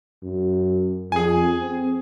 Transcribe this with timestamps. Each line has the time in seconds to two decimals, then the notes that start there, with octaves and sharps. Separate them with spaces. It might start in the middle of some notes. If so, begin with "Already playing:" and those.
0.23 F#2
1.12 F2 G#4 G#5
1.60 C4